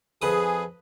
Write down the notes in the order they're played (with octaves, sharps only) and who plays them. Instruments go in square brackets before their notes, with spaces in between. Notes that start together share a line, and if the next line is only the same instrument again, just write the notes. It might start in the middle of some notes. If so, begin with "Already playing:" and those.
[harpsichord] F2 B4 D#6 [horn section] G#4